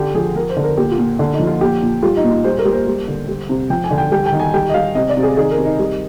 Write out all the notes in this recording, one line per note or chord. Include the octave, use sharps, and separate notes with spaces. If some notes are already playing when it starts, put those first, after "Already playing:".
Already playing: D3 G4
F3 G#4
F3 A#4
C5
D3
A#4
A#2 G4
F4
A#2
D3
D#4
F3
F4
A#2 G4
A#2
G3 F4
D#4
A#2
F4
G3 C5
A#4
G3
C5
G3
D3
G3
C3
F3 G5
G#5
D3
G5
G3 G5
G5
D#3
G#5
G3 G5
D#5
G3 F5
C3 D#5
D5
C3
G#4
D#3 G#4
A#4
C3
D#4
G3